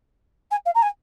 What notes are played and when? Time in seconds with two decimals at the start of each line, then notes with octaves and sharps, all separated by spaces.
0.51 G#5
0.66 F5
0.74 A#5
0.82 G#5